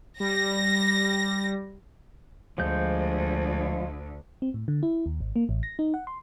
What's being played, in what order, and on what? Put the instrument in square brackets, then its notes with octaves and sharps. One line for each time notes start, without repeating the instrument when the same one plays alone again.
[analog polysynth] G3 [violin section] A#6
[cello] D2 [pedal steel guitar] F3 G#3 G6
[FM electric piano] C4
A2
D3
E4
D#2
G#1
A#3
A1
A#6
D#4
F#5
C6